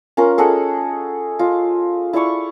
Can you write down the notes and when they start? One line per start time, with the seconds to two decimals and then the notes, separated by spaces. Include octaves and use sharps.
0.17 C#4 F4 A#4
0.38 G#4 A4 D#5 F#5
1.39 F4 D#5
2.13 E4 D5 F5 C#6